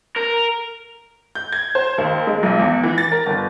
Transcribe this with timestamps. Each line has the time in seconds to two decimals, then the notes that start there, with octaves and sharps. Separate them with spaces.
0.16 A#4
1.35 G6
1.53 G#6
1.75 C5
1.98 D#2
2.27 G#3
2.43 B1
2.59 E2
2.83 E3
2.98 A6
3.12 A#4
3.26 G1